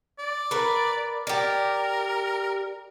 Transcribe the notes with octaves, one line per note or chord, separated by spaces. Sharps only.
D5
A#4 B4
G4 A#4 D5